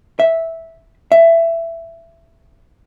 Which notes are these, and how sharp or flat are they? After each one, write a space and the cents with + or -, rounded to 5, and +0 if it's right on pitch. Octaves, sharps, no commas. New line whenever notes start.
E5 -5
E5 +15